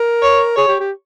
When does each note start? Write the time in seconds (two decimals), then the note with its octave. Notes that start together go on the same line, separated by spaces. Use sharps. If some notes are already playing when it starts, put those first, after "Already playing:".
Already playing: A#4
0.22 C#5
0.56 G#4 C#5
0.68 G4
0.80 G4